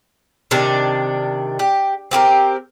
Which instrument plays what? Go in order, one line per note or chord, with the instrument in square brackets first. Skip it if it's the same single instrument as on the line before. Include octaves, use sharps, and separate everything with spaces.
[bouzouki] C3 D#3 D4
G4
C4 G4 G#4 A#4